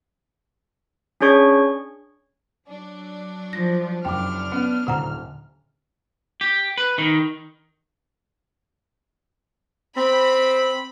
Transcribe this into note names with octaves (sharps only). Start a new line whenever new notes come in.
C#4 D4 G#4 C#5 C#6
F#3 D4
F3 A#6
F#1 F#3 D4 G5 D6 F6
B3 C#4
D#1 D3 F#5 A#5
G4
B4
D#3
C4 B5